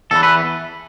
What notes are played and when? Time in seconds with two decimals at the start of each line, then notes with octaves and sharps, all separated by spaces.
0.11 E2 E3 A4
0.23 B4